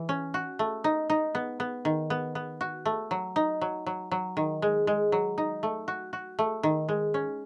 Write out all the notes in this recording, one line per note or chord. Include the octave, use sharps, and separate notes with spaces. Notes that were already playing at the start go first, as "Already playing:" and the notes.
Already playing: E3
C#4
F#4
A3
D#4
D#4
B3
B3
D#3
B3
B3
F#4
A3
F#3
D#4
F#3
F#3
F#3
D#3
G#3
G#3
F#3
D#4
A3
F#4
F#4
A3
D#3
G#3
C#4